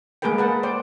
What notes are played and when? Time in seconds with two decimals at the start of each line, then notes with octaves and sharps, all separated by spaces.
0.22 G#3 A#3 G#4 A#4 B4 G5
0.38 B4 F#5 A5
0.63 C5 D5 G5